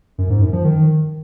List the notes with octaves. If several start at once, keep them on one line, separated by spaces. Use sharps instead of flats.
F#2
G#2
F#2
F3
D#3